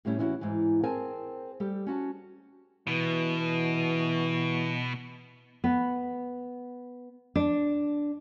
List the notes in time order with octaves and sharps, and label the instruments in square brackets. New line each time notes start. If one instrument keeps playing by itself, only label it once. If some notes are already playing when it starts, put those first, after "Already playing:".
[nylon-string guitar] A2 G3 A3 C#4 E4
E3 C#4 D4 E4 F#4
G#2 E3
C4 G#4 A#4 C5 G#5 A5
G3 G4 A4
C#4 F#4 A5
[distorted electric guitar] B2 [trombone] E3
[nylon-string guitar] B3
D4